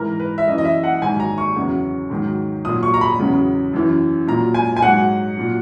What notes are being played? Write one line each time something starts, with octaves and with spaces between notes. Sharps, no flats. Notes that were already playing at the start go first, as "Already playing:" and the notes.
Already playing: G#2 E3 A#4
B4
E5
F#2 E3 D#5
D#5
E5
F#5
G#2 D#3 F#3 G#5
A#5
C#6
E2 C#3 F#3
G#2 D#3 F#3
A#2 F#3 D#6
C#6
A#5
B5
E2 C#3 F#3
F#2 E3
A#2 F#3 A#5
G#5
G#5
G#2 F#3 F#5
A#2 F#3